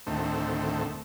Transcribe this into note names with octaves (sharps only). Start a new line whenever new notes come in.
D2 A2 D#3 A3 C4